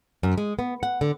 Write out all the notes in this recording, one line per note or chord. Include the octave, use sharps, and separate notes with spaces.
F#2
G#3
B3
F#5
D3